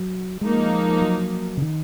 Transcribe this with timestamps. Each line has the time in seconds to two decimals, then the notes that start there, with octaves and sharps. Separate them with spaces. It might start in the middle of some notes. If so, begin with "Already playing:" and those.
Already playing: F#3
0.41 F3 G#3 A#3 D#4
1.02 F#3
1.57 C#3
1.62 D#3